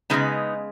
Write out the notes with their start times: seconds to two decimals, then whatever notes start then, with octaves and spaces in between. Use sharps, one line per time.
0.10 C#3 F3 G#3 B3 D#4